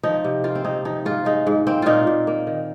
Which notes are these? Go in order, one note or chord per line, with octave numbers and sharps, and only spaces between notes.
F3 D#4
C3
A#3 F4
C4
C3 D#4
F3 D#4
G#2 F4
G#3 D#4
G#2
A#3 C4
A#2 D#4 F4
A#2
A#3
D#3